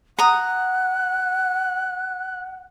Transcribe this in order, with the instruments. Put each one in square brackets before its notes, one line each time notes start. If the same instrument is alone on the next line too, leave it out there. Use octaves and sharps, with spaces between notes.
[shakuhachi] F#5 [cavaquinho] A#5 D#6 [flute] F#6